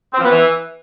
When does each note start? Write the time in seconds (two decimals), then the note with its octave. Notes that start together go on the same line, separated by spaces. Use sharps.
0.13 C4
0.18 F3
0.24 B3
0.30 E3